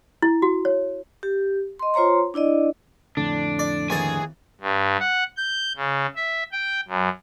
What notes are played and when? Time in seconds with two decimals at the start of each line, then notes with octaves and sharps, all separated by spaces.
0.22 E4
0.42 F#4
0.65 C#5
1.23 G4
1.79 D#5 C6
1.94 F4 C5 C#5 A#5 C6
2.34 D4 E4 D5 D#5
3.17 F2 A2 D3 D4
3.59 D5
3.90 D#2 E3 G#4 G#5 A5
4.61 G2
5.00 F#5
5.37 G6
5.76 C#3
6.16 E5
6.52 G5
6.88 F#2